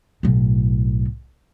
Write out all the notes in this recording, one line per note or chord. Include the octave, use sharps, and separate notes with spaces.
B1 A2